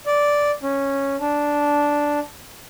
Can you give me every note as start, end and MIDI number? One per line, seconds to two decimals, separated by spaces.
0.06 0.51 74
0.63 1.16 61
1.20 2.19 62